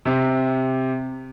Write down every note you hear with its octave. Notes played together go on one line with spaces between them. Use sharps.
C3